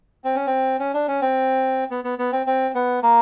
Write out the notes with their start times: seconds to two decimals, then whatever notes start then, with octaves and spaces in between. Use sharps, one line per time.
0.24 C4
0.35 C#4
0.47 C4
0.79 C#4
0.94 D4
1.08 C#4
1.22 C4
1.91 B3
2.04 B3
2.19 B3
2.32 C4
2.46 C4
2.75 B3
3.03 A#3